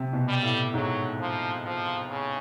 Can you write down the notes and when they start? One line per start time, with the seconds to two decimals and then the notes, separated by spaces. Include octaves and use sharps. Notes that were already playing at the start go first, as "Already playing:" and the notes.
Already playing: C3
0.13 B2
0.28 G3
0.43 A2
0.74 G#2 F#3
1.19 F3
1.65 F3
2.10 C#3